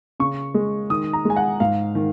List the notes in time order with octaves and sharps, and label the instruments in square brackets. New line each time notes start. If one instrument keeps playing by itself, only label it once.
[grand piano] C#3 C#6
G#3
D#3 D#6
A#5
G#3 G#5
F#5
G#2 F5
D#3